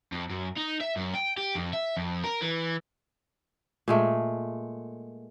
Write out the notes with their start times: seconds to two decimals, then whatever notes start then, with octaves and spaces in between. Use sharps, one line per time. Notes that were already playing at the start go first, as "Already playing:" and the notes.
0.12 F2
0.30 F#2
0.57 D#4
0.81 E5
0.96 F#2
1.14 G5
1.37 G4
1.55 F2
1.73 E5
1.97 F2
2.24 A#4
2.42 E3
3.88 A#2 G#3 A3